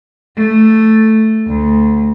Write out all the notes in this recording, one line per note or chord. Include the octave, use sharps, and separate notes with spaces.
A3
D2